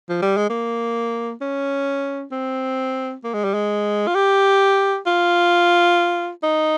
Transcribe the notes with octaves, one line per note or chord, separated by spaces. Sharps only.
F3
G3
G#3
A#3
C#4
C4
A#3
G#3
G3
G#3
F4
G4
F4
D#4